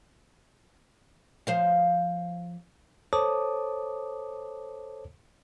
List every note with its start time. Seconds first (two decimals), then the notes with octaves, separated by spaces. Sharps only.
1.47 F3 C5 F5
3.13 A4 C5 C#5 A5 D6 D#6